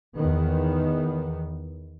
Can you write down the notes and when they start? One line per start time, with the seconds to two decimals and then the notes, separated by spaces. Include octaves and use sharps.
0.17 E2 D#3 B3